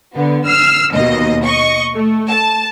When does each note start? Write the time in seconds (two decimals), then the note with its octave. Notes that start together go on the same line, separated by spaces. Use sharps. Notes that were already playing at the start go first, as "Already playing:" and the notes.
0.14 D3 B3
0.47 E6 F6 C7
0.94 D#2 B2 D#5
1.44 D#5 C#6
1.94 A3
2.29 A5